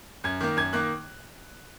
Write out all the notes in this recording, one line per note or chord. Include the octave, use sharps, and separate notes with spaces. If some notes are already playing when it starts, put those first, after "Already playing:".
F#2 G#6
D#3 A#3
F#2 G#6
D#3 A#3 F#6